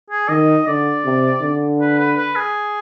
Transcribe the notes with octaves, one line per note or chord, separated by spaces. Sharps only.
G#4
D#3 D#5
D3 D5
C3
D3
B4
B4
B4
G#4